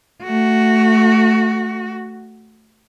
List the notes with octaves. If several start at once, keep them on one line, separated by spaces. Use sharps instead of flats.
A3 F#4